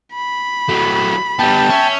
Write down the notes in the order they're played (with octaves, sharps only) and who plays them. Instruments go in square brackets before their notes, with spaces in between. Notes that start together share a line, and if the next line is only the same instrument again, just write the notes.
[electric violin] B5
[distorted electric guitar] F#3 A3
[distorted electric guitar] G3 B3 [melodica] G5 A5
[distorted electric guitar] C#4 [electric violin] E5